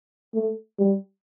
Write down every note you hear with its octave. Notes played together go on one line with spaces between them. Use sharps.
A3
G3